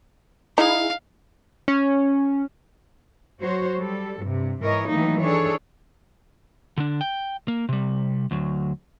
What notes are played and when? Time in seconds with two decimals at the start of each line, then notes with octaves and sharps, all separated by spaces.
0.58 D#4 E4 G#4 F5
1.68 C#4
3.40 F#3 F#4 C5 C#5
3.79 G3 A4
4.21 G2 C3
4.61 G#2 E3 A#4 C#5 D#5
4.89 D#3 E3 F#3 A3 A#3 D#4
5.23 D4 G#4 A4 C#5
6.78 D3 D4
7.01 G5
7.48 A#3
7.69 C3 G3
8.31 D2 F#3